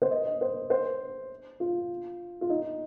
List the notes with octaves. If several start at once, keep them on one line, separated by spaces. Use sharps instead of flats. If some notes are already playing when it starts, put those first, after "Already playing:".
C5
D#5
D#5
C5
C5
F4
F4
D#4